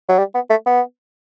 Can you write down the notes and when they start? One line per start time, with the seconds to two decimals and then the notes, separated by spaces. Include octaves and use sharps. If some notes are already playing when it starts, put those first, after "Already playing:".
0.09 F#3
0.19 G3
0.35 B3
0.50 A3
0.66 B3